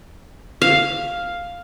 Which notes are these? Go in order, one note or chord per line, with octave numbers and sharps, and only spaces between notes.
F5